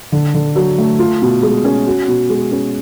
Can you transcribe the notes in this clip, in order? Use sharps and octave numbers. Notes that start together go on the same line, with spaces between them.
D3
D3
F#3
A3
F4
B2
G#3
C#4
F#4
B2
G#3
C#4